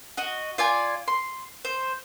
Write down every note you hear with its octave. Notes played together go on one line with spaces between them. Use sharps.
F#4 D#5
F4 D5 G#5
C6
C5